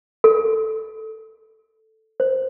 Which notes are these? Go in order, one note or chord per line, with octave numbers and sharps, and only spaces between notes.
A4
C5